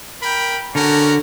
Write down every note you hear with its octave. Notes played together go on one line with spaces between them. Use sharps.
A#4 G5 B5
D3 C#4 F#4 A#4